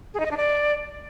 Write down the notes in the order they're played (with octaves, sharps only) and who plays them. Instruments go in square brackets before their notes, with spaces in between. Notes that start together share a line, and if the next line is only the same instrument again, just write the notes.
[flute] G#4
D#4
D#5
D4
D5